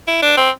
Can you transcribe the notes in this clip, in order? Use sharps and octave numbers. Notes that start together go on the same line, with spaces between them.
E4
D4
C4